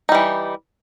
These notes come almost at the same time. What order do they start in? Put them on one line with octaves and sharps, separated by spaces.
D#4 G3 E3